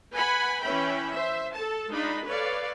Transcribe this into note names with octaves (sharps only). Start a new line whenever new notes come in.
B4 F#5 G#5 B5
E3 C#4 E5 G5 B5
C5 E5
A4 A5
G#3 D4 D#4 F4 B5
A4 B4 C#5 D5 F5